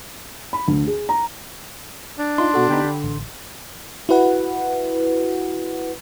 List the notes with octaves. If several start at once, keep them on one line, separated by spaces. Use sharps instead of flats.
B5
D2
G#4
A#5
D4
D#4 F4 C6
B2 F#4 A4
D3 B3 D#4 G4 G5 B5
D3
A1
E4 F#4 B4 F#5